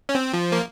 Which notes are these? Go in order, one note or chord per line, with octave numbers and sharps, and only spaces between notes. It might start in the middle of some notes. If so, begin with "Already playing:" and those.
C#4
C4
F3
A#3